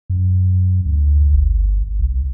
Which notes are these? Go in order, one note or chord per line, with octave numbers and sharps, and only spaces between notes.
F#2
D2
G1
C2